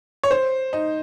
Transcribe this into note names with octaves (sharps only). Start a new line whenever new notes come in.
C#5
C5
D#4